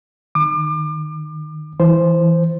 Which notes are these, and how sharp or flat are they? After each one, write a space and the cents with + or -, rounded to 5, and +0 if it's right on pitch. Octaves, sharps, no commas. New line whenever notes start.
D#3 -20 D6 +35
E3 +0 C5 +0